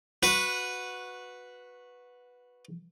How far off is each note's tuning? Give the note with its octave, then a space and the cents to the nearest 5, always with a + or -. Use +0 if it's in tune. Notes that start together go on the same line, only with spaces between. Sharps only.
F#4 -15 B4 +0